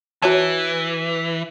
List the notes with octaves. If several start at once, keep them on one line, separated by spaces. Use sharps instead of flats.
E3 F#4 C#5 A5